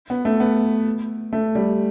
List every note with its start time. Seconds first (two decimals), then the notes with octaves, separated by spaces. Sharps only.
0.10 B3
0.25 A3
0.40 B3
1.33 A3
1.55 G3